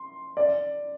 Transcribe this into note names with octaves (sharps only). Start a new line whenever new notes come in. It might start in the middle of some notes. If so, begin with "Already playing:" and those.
Already playing: C6
D5